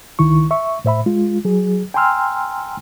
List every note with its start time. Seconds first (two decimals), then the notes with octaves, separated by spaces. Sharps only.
0.19 C#2 D#3 E4 C#6
0.51 E5 C#6
0.85 A2 C5 E5 B5
1.06 G#3 F4
1.45 F#3 G#4
1.94 G5 G#5 A#5 C6 E6 F6